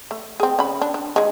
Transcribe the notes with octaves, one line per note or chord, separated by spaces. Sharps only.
A3
C4 G#4
C#3 B5
D4
D4
D#3 G#3